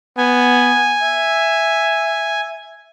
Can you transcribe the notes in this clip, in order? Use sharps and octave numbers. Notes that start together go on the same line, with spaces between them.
B3 G#5
E5